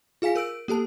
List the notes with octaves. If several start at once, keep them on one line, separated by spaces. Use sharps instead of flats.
F4 G#4 F5 G#5 B6
A#4 E6 D7
A#3 G4 A4 A5